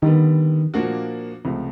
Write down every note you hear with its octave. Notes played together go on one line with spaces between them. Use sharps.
D3 D#3 G3 B3
A#2 F3 A#3 D4 F#4
C#2 C3 F3 A3